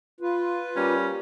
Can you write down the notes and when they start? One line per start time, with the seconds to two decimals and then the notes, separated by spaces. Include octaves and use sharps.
0.20 F4 B4
0.76 G3 A#3 C#4